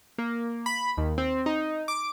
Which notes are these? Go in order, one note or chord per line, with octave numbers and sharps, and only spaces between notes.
A#3
B5
D#2
C4
D#4
D6